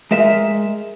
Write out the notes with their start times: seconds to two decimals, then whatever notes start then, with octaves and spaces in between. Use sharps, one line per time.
0.11 G#3 A#4 E5